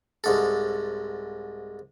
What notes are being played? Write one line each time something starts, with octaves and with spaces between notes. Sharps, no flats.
C2 G#2 A4